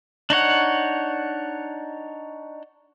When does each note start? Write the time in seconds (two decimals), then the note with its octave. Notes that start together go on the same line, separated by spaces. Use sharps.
0.30 D4 D#4 C#5 F#5